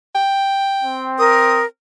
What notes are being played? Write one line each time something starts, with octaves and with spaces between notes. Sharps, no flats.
G5
C4
A#4 D#6